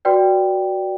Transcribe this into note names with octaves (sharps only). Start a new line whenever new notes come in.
F#4 B4 D5 G5